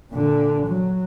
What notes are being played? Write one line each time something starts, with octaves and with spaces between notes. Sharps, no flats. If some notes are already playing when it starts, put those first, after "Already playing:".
A#2 D3
F#3